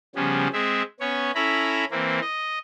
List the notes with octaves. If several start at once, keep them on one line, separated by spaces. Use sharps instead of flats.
C#3 F3 G3 B3 C#4
G#3 C4 G#4 E5
B3 C#4 C#5
C#4 E4 A4 A#5 B5
E3 A#3 C4
D#5